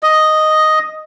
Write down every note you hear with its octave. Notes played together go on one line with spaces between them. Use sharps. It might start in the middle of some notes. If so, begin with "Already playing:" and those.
D#5